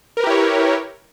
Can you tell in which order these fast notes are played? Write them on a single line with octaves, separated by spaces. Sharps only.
A#4 B4 G4 E4 C#5